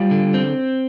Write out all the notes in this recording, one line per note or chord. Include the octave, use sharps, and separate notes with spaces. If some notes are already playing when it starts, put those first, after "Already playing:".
Already playing: G3 F4
D3
C4